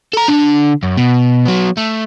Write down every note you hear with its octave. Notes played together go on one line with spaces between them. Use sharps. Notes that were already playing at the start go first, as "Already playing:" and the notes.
A4 A#5
D3 D4
F#2
B2
F#3 B3
A3